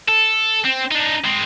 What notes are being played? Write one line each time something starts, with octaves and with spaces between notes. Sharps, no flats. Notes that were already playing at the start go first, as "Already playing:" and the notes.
A4
C4
D4 D#4
G#3 C4